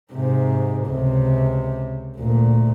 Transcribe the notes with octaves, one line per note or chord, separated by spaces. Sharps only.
G#2 C3
C#2 C3
D2 A#2